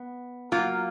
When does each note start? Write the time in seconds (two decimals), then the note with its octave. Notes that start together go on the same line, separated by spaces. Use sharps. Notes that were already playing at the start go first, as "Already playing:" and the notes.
Already playing: B3
0.52 F#3 A#3 F4